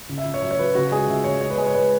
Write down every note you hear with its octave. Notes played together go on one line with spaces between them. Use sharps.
C#3
E5
C#3
C#5
F#3 E5
C#5
F#3 B4
C#3 F#4
G#3 G#4
C#3 E5
C#3 C#5
G#3 C#5
B4
G#3 G#4
C#5
G#3 B4